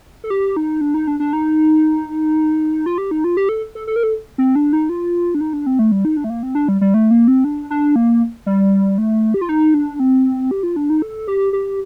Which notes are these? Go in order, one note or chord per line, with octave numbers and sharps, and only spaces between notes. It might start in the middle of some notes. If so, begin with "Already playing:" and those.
A4
G4
D#4
D4
D#4
D4
D4
D#4
F4
G4
D#4
F4
G4
A4
A4
A4
A#4
A4
C4
D4
D#4
F4
D4
D#4
D4
C4
A3
G3
D#4
D4
A3
A#3
C4
D4
G3
G3
A3
A#3
C4
D4
D4
A#3
G3
A3
G4
F4
D#4
D4
C4
G4
F4
D4
D#4
A4
G4
G4